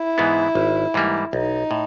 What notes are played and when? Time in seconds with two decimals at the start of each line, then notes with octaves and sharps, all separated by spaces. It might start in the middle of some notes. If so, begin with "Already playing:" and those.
Already playing: E4
0.18 G#2 E3 G#3 B3
0.55 G#1
0.94 G#2 E3 G3 A#3
1.33 B1 D#4
1.71 A2